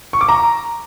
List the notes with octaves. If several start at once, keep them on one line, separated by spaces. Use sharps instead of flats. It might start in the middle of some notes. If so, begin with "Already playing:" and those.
C#6
D6
A#5